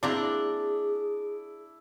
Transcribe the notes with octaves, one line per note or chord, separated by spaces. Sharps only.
A#3 C4 D4 E4 G#4 A#5